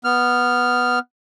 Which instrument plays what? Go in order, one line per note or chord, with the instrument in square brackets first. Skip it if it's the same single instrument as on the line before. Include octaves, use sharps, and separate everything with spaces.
[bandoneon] B3 F6